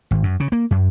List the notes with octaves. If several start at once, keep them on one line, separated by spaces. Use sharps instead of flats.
G#1
F#2
C#3
A#3
F#2